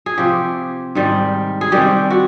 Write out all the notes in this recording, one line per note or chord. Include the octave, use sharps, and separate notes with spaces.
G#4
C3 F3 G4
G#2 D#3 G3
G#4
C3 D#3 G3 G4
F#4